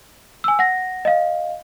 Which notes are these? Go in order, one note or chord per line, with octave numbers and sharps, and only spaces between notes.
G#5 E6
F#5 A#6
D#5 F5